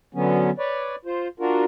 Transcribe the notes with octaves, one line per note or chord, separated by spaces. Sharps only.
D3 F#3 B3 C#4
B4 C#5 D5
F4 C5
D4 F4 F#4 A#4